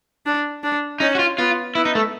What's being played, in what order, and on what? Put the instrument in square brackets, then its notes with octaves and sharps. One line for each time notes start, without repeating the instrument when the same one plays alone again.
[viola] D4
D4
[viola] C#4 [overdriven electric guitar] D#4
[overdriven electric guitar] F#4
F4
[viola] B3 [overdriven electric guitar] F4
[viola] B3 [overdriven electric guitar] E4
[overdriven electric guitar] D#4
A3